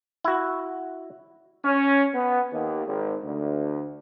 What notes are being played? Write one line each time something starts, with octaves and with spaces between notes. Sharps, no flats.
E4 F#4
C#4
B3
D#2
G#1
D2